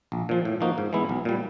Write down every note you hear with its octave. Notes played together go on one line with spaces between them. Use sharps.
A#1
A#2 F3
A2
F3 A#3 D#4 F#4
G#2
E3 G#3 B3 E4
B1
A#2 G3